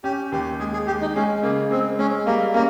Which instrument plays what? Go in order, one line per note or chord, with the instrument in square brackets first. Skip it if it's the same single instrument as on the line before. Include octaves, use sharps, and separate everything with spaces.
[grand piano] C#4 [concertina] G4
[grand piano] D#2 [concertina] G4
[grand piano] G#3 [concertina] G#4
[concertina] G#4
[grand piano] G#3 [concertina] G4
[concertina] D#4
[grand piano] G#3 [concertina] C#4
[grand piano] C#3 [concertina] A#3
[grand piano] G#3 [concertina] C4
[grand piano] G#3 [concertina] C#4
[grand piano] G3 [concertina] A#3
[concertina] A#3 [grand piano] C#4